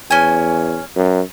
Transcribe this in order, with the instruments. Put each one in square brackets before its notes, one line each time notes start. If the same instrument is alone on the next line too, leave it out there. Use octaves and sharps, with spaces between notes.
[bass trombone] E2 [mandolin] C#4 G#5
[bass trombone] F#2